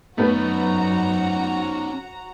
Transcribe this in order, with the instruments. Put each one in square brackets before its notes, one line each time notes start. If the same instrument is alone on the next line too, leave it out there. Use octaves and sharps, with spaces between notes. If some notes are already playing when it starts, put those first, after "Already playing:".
[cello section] F#2 [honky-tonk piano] A3 B3 B4 [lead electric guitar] C#4 D#4 [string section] F#4 A#5